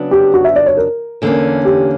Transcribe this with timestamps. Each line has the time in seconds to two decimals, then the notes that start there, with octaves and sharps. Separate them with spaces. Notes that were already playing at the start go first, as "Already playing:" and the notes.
Already playing: C#3 F#3 B3 D4
0.11 G4
0.34 F#4
0.44 E5
0.56 D5
0.66 C#5
0.77 A#4
1.22 E2 D3 A#3 C#4
1.65 G4